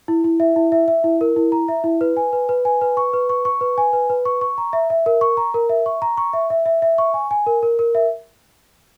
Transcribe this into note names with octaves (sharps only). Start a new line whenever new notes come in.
E4
E4
E5
E4
E5
E5
E4
A#4
E4
A#5
E5
E4
B4
G#5
B4
B4
G#5
B4
C#6
B4
C#6
C#6
B4
G#5
B4
B4
C#6
C#6
A#5
E5
E5
A#4
C#6
A#5
A#4
E5
C#6
A#5
C#6
E5
E5
E5
E5
C#6
G#5
G#5
A#4
A#4
A#4
E5